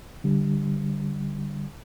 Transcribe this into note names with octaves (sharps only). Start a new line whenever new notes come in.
D3 G3